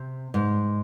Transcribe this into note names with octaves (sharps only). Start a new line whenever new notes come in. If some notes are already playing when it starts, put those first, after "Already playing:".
Already playing: C3
G#2